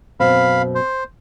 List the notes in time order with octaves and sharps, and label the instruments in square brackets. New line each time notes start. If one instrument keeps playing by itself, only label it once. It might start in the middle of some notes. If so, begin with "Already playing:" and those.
[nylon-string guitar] F#2 B2 C4 [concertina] F5 B5
[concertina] C5